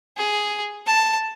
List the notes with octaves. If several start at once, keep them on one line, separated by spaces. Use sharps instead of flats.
G#4
A5